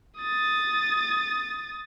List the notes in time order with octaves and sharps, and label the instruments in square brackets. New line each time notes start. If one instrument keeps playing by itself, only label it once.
[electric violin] D#6 A6